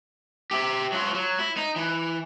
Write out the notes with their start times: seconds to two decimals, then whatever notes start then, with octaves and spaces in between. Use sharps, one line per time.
0.51 G4 E5
0.92 F#3 F4
1.15 F#3
1.39 E4
1.57 D#4
1.76 E3